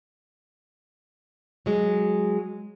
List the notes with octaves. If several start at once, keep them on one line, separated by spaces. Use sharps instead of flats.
F#3 G#3